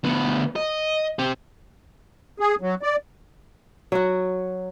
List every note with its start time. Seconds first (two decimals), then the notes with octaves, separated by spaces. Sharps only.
0.04 D2 B3
0.56 D#5
1.19 C4 G4
2.40 G#4
2.61 F#3
2.82 D5
3.92 F#3 F#4